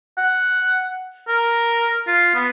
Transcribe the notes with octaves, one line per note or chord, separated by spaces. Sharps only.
F#5
A#4
F4
B3